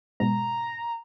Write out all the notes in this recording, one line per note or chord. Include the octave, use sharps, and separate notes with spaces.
G#2 B2 A#5